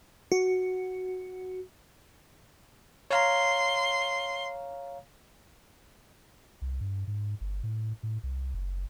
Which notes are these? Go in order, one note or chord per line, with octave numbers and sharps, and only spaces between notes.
F#4
C#5 F5 A#5 C6
C2
G2
G#2
G1
A2
A2
C2
F#1